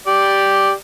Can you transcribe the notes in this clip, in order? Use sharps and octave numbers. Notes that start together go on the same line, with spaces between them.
G4 D5